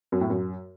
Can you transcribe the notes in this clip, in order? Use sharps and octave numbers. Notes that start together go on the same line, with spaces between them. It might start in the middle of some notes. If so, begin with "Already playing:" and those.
F#2
A2
F#2